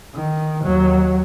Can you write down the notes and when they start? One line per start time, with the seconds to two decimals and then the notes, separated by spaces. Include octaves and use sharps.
0.14 D#3
0.63 D#2 F#3